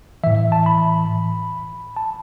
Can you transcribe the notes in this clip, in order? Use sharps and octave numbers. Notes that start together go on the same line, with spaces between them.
A2 E3 E5
A5
B5
A5